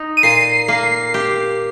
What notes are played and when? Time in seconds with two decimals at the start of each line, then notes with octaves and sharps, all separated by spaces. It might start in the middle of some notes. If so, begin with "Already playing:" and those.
Already playing: D#4
0.17 D#7
0.23 A#2 C7
0.68 A#3
1.14 G4